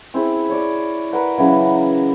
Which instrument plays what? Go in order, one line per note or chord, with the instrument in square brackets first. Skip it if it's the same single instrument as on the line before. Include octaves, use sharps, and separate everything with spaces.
[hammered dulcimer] C4 E4 G#4
C#5 D5
A#4 B4 D5 F#5
C#3 E3 F#3